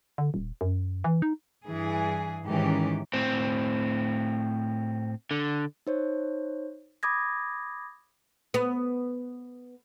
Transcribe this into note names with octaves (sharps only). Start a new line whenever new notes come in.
D3
D#1
F#2
E3
D#4
G2 E3 G#4
G#2 D#3 E3 C#4 G4
A2 C4
D3
D#4 C5 C#5
B5 D6 D#6 G#6 A#6
B3